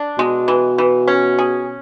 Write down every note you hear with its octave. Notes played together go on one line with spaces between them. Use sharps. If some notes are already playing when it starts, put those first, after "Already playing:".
Already playing: D4
B2 G#3
E3
E3
C#4
G#4